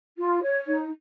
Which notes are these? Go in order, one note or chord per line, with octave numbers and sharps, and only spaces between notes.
F4
C#5
D#4